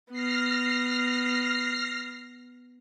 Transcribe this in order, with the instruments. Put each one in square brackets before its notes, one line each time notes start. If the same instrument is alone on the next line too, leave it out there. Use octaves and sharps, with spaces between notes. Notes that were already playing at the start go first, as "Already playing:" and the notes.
[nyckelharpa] B3 [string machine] F6 A#6 C7